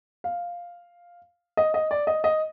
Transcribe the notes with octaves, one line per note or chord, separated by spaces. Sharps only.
F5
D#5
D#5
D5
D#5
D#5